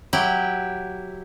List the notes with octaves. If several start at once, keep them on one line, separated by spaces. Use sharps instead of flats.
F#3 E4 G4 G5